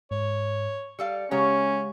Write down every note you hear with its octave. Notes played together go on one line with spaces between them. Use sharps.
G#2 C#5
G3 A4 F5 C#7
C#3 G#3 C#4 G4 C#5 F#5 A#5